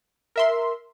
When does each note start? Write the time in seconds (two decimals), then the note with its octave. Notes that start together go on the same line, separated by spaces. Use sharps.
0.36 A#4 E5 C6